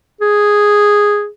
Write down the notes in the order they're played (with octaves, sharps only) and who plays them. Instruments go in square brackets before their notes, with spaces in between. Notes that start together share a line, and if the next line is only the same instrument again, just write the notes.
[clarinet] G#4